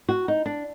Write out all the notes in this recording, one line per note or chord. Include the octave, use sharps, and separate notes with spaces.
F#4
D#4
D4